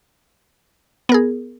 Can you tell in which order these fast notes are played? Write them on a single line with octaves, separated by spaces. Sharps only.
B3 A#4 G#4